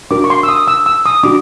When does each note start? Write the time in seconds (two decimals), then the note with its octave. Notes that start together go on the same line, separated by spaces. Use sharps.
0.11 D4 F#4 A#4 D6
0.24 C#6
0.30 C6
0.43 E6
0.49 D#6
0.68 E6
0.86 E6
1.06 D#6
1.23 D4 F#4 D6